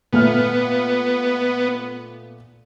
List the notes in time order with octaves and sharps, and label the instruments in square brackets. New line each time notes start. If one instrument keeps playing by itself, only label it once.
[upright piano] A#2 A3 F6 [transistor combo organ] B3